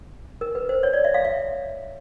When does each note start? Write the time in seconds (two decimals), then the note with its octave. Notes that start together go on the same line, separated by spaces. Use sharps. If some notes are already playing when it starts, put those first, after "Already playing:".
0.41 A#4
0.55 B4
0.69 C5
0.83 C#5
0.93 D5
1.04 E5
1.14 F5
1.25 E5